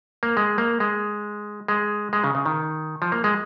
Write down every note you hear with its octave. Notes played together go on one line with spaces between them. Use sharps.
A#3
G#3
A#3
G#3
G#3
G#3
C#3
C#3
D#3
F3
A#3
G#3